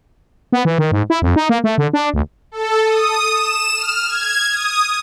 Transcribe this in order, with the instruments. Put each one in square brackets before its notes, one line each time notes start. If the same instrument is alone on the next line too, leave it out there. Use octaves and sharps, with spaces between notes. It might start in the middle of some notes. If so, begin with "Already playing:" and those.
[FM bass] B3
E3
D#3
G#2
E4
F2
D#4
A#3
A3
D3
D4
D2
[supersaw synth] A4
D#6
E7
F6
G#6
D#6